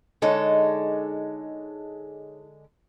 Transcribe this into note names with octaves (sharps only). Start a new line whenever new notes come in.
D3 G#3 D#4 A4 C#5